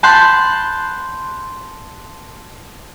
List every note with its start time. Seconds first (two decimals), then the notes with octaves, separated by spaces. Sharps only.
0.03 A5 B5 C6 F#6 G6